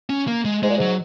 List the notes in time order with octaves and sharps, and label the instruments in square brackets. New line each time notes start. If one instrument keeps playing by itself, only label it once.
[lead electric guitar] C#4
A#3
G#3
[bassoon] G#2 [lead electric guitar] G#3
[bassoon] A#2
[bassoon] G#2 [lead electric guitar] F#3